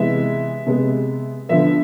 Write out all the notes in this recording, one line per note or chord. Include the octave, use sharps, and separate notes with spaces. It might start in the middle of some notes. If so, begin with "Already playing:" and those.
Already playing: C3 E3 G#3 B3 E5
C3 G#3 B3
D3 F3 B3 E5